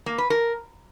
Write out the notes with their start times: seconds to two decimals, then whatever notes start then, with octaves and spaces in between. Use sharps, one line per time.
0.06 A#3
0.18 B4
0.30 A#4